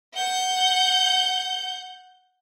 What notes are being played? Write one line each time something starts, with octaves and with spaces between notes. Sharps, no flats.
F#5 G6